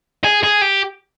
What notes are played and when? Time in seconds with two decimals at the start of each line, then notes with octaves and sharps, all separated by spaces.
0.24 G#4
0.43 G#4
0.62 G4